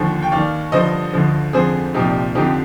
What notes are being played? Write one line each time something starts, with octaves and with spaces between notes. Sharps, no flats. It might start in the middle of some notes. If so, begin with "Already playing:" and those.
Already playing: D#2 D3 F3
G5
D#2 D#3 D5 F5
G2 D3 F3 C5 D#5
D2 D3 F3
F2 D3 F3 G#4 C5
C2 A#2 F3 D#4 G4
F2 D3 F3 D#4 G4